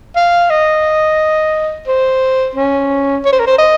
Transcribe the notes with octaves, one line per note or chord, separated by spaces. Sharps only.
F5
D#5
C5
C#4
C#5
C5
A#4
C5
D#5